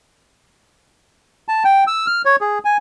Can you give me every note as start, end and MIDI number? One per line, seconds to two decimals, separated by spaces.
1.48 1.63 81
1.64 1.84 79
1.87 2.07 88
2.07 2.22 89
2.25 2.36 73
2.41 2.59 68
2.65 2.77 80